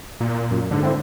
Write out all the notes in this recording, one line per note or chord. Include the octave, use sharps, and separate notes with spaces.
A#2
F#2
G#2 D3
C4 E4 C5